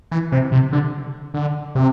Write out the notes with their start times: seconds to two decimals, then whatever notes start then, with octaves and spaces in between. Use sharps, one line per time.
0.11 E3
0.32 C3
0.52 C3
0.73 D3
1.34 D3
1.75 C3